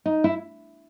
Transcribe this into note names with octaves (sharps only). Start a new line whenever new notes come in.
D#4
E4